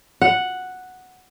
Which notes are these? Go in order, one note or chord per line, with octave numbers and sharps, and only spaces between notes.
F#5